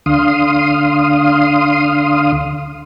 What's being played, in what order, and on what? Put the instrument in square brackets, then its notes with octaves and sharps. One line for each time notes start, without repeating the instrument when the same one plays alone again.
[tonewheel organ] D2 D3 F5 C6 D#6